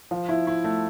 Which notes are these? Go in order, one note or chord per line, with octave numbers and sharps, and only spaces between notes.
F3
E4
E4
A3